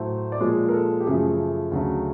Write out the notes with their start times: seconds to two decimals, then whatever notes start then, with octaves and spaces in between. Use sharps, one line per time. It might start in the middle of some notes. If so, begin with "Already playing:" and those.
Already playing: A2 F#3 A3 C5
0.32 D5
0.40 A#2 F3 G#3 C#5
0.69 A#4
0.74 A4
1.00 G4
1.07 F#2 C#3 F3 A3 G#4
1.71 D2 C#3 F#3 A3